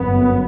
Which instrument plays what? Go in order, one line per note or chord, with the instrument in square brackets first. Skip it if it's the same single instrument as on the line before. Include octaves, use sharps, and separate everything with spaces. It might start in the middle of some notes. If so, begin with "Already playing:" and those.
Already playing: [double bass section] G1 F#2 B3